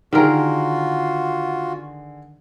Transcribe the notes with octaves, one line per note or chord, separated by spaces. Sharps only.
D3 D#3 F4 F#4 G#4 A#4